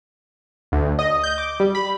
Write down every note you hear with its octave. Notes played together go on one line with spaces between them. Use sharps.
D2
D#5
G6
D6
G3
B5